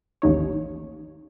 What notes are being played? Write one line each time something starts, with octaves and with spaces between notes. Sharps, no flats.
A1 D#2 D#4 C#5